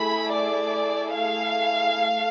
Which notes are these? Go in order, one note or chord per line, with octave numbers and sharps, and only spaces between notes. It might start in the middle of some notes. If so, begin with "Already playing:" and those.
Already playing: A3 E4 G#4 B5
D5
F5
A3